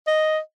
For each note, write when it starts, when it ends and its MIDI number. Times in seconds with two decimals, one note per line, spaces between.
0.07 0.39 75